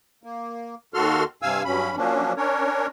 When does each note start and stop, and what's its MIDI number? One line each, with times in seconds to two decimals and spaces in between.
0.23 0.75 58
0.94 1.24 39
0.94 1.24 51
0.94 1.24 66
0.94 1.24 69
0.94 1.24 84
0.94 1.24 89
1.42 1.63 43
1.42 1.63 48
1.42 1.63 77
1.42 1.63 80
1.42 1.63 88
1.65 1.96 43
1.65 1.96 54
1.65 1.96 61
1.65 1.96 83
1.97 2.33 53
1.97 2.33 54
1.97 2.33 58
1.97 2.33 61
1.97 2.33 62
2.37 2.87 61
2.37 2.87 62
2.37 2.87 70
2.37 2.87 73